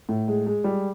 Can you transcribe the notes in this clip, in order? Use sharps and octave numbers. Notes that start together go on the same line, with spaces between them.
A2
G#3
G#3
G3